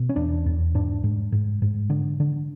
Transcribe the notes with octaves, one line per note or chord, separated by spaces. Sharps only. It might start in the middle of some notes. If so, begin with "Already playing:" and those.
Already playing: B2
C#4
E2 D4
E2
G#2 D4
G#2
G#2
G#2
D3
D3